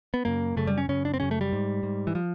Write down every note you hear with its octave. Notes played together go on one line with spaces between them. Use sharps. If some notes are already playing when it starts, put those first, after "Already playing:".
B3
F#2 C#3 A#3
F#2 C#3 A3
G3
C#4
F#2 C#3 C#4
D4
C4
F#2 C#3 C#4
A3
G3
G#2
G#2
E3
F3